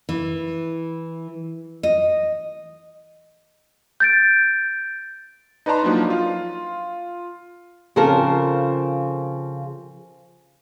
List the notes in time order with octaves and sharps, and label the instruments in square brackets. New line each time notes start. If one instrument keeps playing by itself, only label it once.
[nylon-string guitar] E3
D#5
[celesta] G6 A6 D7
[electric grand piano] D#4 B4 D5 A5 A#5 C6
F3 F#3 A#3 D4 D#4
F4
[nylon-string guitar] C#3 F3 C4 F4 A4 A#4